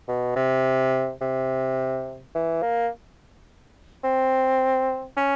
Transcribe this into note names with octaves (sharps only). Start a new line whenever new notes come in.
B2
C3
C3
E3
A#3
C4
C#4